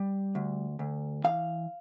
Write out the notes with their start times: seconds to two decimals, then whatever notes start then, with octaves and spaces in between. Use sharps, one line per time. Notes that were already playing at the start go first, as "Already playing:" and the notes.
Already playing: G3
0.35 D2
0.79 D2
1.24 E3 F5